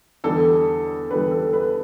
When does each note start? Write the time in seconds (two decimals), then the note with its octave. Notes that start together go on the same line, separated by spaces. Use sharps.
0.24 E2 D3 G3 A4
1.10 E2 D3 G3 B4
1.31 A4
1.53 B4